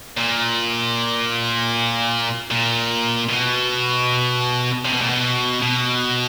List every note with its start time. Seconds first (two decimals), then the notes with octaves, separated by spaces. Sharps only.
0.17 A#2
2.51 A#2
3.29 B2
4.85 C3
4.92 B2
5.01 A#2
5.09 B2
5.62 B2